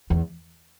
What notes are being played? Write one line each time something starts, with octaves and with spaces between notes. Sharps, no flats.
E2